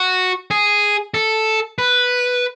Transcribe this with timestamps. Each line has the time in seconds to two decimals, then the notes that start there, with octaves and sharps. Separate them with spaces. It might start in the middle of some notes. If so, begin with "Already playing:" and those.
Already playing: F#4
0.51 G#4
1.14 A4
1.78 B4